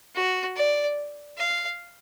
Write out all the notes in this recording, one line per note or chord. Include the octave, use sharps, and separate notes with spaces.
F#4
D5
F5